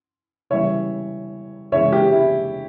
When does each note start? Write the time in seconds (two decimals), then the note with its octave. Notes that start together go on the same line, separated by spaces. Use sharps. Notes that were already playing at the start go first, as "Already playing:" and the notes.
0.50 C#3 E3 G3 C#5 E5
1.72 C#3 E3 G#3 C#5 E5
1.92 G4
2.12 E4